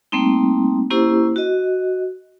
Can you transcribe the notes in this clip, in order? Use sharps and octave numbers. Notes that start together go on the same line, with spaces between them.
G3 A3 A#3 C4 D#4
A#3 C#4 E4 G4 C5
F#4 D#5